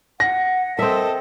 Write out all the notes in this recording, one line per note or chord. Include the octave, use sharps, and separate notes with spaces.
F#5 A#6
C4 A4 A#4 D#5 E5